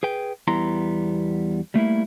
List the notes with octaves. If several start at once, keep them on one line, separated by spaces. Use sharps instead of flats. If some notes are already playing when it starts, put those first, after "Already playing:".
G#4 B4 G5
E2 G3 B3 E4 A#5 C6
G3 A3 A#3 E4